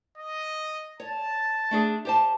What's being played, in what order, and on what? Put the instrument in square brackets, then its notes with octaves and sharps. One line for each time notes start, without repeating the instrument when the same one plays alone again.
[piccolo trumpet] D#5
[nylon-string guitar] C#5 [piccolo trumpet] A5
[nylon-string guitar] A3 D4 G#4
G4 C5 A5